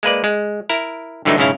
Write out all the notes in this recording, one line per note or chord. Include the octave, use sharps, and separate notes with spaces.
G#3 A#3 B4 D5
G#3
E4 A#4
G2 D3 E3 F#3 A3 D#4
B1 G#2 C#3 C#4 E4 F5